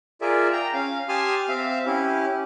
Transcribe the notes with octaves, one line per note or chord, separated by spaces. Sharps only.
F4 G#4 A#4 D5 E5
G5 A#5
C#4 F5
G4 G#5 A5 C6 D#6 F6
C4 E5 F5
C#4 E4 G4